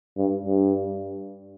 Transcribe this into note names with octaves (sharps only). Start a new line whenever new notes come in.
G2
G2